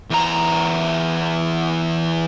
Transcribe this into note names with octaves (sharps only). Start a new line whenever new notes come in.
E2 A#5